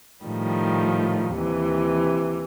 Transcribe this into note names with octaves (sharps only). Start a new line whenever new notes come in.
A2 D#3 F3 G3
D#2 C3 E3